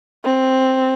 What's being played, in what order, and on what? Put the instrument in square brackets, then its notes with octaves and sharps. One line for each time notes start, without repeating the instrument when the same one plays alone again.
[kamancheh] C4